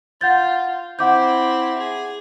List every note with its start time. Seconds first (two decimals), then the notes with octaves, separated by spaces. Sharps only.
0.21 F4 F#5 G6 A6
0.99 C4 E4 F#5 D6 G6
1.78 G#4